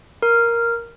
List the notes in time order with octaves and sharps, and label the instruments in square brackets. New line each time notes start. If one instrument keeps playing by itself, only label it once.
[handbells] A#4